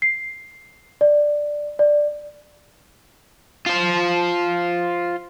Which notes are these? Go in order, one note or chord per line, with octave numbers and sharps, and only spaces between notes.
C7
D5
D5
F4 C5